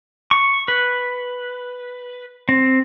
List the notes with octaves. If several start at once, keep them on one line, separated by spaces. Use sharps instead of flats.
C#6
B4
C4